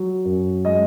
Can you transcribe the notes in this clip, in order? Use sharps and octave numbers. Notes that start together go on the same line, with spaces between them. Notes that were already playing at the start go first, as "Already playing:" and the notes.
Already playing: F#3
F#2
G#3 D#5